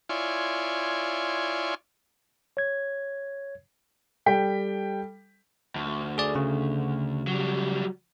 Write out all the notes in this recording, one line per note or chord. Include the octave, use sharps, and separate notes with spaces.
E4 F4 C#5 D5 G#5 C6
C#5 G#6
G3 A4 G5 B6
D2
G#4 D5
C#3
F#3 G3